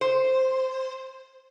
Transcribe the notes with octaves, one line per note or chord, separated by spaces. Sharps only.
C5